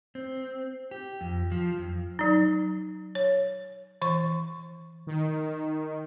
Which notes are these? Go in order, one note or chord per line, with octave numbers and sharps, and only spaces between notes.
C4
G4
F2
F3
F2
F#3 D#4
C#5
E3 C#6
D#3